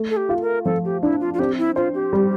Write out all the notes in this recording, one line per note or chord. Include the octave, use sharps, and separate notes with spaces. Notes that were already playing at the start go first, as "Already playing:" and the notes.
Already playing: A3
A4
G4
F4
A#4
F3 A4
G4
D4 E4
F4
F4
C4 G4
E4
F4 C5
G4
G3